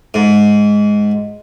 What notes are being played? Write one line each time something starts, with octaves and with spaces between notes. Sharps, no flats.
G#2